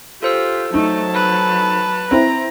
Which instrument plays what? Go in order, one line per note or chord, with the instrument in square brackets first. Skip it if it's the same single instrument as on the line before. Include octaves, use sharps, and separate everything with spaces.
[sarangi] F4 [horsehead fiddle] G4 [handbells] A4 C5 E6
[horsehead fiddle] F#3 A5 [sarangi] A3 [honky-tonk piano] D#4
[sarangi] B4
[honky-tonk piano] C4 E4 [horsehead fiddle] A#5